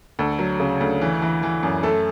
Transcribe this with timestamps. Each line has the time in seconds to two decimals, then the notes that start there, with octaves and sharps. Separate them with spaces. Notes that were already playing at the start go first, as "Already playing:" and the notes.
0.19 D2 A4
0.39 F#3
0.60 C#3
0.81 D2
1.01 E3
1.22 E3
1.43 E3
1.63 F#2
1.83 A3 A4